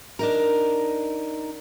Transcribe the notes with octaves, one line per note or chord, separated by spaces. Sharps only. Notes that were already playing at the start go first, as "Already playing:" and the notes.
D4 D#4 A#4